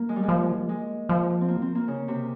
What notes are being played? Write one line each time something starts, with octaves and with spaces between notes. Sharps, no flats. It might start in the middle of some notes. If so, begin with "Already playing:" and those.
Already playing: A#3
G#3
G3
G#3
F3
G#3
F3
C4
A#3
C4
A#3
C#3
C3